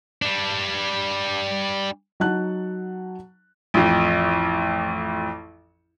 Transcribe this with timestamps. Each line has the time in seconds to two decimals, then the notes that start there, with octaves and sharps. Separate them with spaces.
0.22 G3 D4
2.20 F#3 D#4 F#5 A5 F#6
3.74 A1 F2